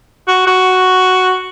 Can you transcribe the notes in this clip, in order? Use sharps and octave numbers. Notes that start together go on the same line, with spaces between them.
F#4
F#4